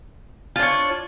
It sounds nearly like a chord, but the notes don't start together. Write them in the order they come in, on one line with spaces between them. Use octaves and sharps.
F4 D4 C#5